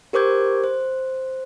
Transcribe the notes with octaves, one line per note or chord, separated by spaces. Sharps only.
G4 A#4 C5 D6 G6 G#6
C5